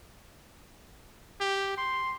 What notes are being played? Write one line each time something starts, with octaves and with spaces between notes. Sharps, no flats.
G4
C6